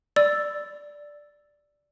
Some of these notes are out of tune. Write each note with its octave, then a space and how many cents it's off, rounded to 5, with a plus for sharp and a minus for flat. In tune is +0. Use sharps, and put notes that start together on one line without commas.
D5 +0 E6 +0